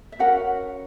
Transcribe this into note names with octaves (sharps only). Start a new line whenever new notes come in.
E5
C#4 F#4 A#4 F#5